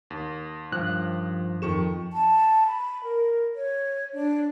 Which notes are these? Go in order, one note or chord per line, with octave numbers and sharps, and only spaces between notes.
D#2
G2 F3 F#6
F2 D#3 C#6 E7
A5
B5
A#4
C#5
D4